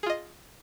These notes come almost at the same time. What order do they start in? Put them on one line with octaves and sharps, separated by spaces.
G#4 F4 D#5